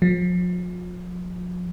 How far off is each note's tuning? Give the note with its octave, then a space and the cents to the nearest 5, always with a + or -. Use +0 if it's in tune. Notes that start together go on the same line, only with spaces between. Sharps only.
F3 +40